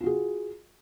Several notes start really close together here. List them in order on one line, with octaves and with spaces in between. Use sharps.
F4 F#4 G#4